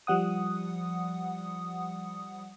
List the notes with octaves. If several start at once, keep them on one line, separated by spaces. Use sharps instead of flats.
F3 G3 F#5 D#6